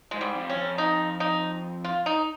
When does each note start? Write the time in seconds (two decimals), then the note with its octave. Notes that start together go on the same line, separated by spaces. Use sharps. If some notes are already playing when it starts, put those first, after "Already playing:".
0.11 G#2 G#3
0.21 G3
0.35 F2
0.50 C#4
0.56 F2
0.78 D#4
1.20 D#4
1.84 F4
2.06 D#4